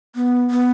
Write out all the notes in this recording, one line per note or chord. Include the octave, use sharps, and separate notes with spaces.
B3
B3